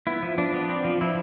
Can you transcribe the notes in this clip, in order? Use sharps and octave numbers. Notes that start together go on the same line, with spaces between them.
B3 E4
F3
F3 D4
B3
C4
F3
F3 E4